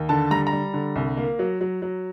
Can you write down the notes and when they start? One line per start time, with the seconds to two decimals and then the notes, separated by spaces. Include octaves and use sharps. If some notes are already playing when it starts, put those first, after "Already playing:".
Already playing: D#2
0.09 D3 A5
0.31 G3 A#5
0.47 A#5
0.53 G3
0.74 D3
0.96 C2
1.17 A#3
1.39 F#3
1.61 F#3
1.82 F#3